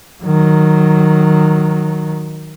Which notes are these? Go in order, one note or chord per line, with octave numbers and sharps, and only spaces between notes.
D#3 F#3